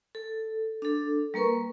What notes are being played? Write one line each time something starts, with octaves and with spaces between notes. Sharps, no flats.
A4
D4 A4
G3 A#3 A#4 B4 C#6